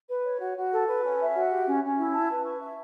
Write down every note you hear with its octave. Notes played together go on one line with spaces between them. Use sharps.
B4
C#5
F#4
F#4
A4
B4
C#4
E5
F#4
G4
C#4
C#4
E4
A5
B4
C#6
E5